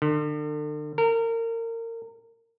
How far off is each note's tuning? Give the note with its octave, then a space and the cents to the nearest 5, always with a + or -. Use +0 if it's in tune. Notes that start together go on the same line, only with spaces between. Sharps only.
D3 +40
A#4 -30